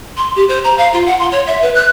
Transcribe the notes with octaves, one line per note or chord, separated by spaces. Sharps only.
C6
G4
C5
A#5
F5
F4
F#5
C6
C#5
E5
B4
F#6